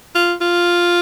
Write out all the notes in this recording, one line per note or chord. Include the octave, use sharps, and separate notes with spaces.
F4
F4